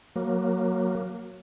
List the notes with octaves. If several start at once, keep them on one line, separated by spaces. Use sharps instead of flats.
F#3 A#3